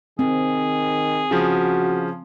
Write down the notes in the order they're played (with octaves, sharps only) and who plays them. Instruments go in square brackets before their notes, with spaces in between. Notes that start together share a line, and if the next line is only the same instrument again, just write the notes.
[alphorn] D#3 [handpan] C4 [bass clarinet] G#4
[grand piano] C#3 F3 [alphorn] F#4